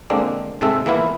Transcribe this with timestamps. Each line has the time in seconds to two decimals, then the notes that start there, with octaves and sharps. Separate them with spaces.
0.10 D3 G#3 A#3 C4 D4 F4
0.61 G#2 C3 G#3 C4 A4 E5
0.86 E3 A#3 B3 E4 F4